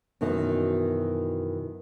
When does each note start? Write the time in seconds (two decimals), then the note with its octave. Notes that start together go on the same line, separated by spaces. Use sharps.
0.21 F#2 B2 D#3 E3